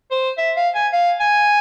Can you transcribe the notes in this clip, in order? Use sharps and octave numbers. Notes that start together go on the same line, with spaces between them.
C5
E5
F5
G#5
F5
G#5